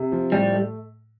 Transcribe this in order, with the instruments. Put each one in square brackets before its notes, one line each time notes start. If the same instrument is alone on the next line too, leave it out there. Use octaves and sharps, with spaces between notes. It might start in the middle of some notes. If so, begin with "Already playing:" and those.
Already playing: [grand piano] C3
F3
[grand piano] A2 [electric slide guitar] G3
[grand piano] A3